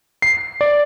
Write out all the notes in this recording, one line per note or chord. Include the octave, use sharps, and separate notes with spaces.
C7
D5